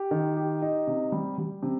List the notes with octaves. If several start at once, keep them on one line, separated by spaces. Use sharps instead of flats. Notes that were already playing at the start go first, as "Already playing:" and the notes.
Already playing: G4
D#3
G4
D#4
C3
G3
G3
C3